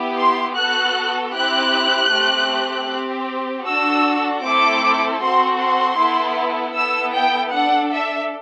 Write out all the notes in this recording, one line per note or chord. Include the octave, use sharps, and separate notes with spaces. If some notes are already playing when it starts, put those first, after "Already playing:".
Already playing: B3 E4 G4
C6
B3 F#4 A4 F#6
C4 E4 G4 F#6
A3 C4 G4
C4 G4
D4 F#4 A4 E6
A3 C4 E4 A4 D6
C4 F#4 A4 C6
C6
B3 E4 A4
B3 E4 A4 E6
G5
D4 A4 F#5
E5